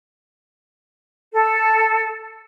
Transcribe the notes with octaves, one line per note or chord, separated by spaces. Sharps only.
A4